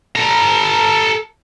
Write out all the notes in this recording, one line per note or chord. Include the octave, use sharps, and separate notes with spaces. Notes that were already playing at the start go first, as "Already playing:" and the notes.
A4 A#5